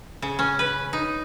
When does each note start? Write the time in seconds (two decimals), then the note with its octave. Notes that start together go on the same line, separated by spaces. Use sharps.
0.22 C#3
0.39 C#4
0.59 B4
0.93 D#4